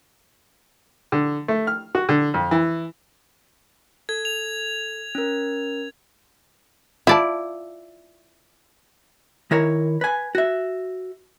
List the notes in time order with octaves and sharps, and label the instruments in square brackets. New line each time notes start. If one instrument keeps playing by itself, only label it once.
[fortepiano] D3
A3
F6
F#4
D3
F2
E3
[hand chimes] A4 [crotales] G#6
[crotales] F7
[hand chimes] C#4 A#4
[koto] E4 D5 [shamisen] F4 A5
[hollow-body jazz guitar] D#3 E4 A#4 C#5
B4 G#5
F#4 E5